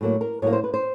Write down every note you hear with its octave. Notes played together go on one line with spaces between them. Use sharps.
A2 F#3 A#3
A#4
A2 F#3 A#3 C#5
C5
B4
C5